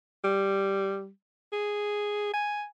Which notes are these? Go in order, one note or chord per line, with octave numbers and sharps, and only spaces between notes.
G3
G#4
G#5